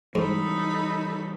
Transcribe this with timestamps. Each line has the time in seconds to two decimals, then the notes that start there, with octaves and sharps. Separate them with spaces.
0.15 G#2 E3 G3 D#4 A4 B5